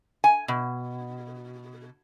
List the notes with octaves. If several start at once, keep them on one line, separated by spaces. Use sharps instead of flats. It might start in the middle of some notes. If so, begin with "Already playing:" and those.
G#5
B2